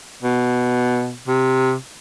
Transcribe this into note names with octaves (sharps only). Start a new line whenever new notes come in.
B2
C3